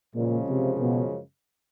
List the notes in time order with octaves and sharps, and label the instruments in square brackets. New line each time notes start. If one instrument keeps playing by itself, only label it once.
[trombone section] F#2 C#3 F3 G#3 [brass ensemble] A#2
[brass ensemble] C3
B2